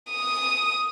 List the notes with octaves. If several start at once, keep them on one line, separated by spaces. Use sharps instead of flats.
D#6